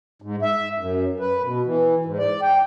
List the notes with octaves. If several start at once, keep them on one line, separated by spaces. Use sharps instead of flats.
G#2
E5
F#2
B4
B2
E3
G#2
D5
G5